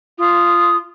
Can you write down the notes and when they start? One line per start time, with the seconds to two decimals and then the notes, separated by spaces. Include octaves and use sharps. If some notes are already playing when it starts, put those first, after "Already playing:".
0.18 F4 D#6